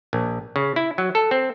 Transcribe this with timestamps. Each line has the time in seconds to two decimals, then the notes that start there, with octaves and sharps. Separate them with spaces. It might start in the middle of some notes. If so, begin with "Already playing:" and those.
0.13 A#1
0.56 C#3
0.76 E4
0.98 F#3
1.15 A4
1.31 C4